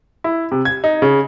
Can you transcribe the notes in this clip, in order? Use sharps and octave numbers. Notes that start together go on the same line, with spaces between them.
E4
C3
G#6
D#4
C#3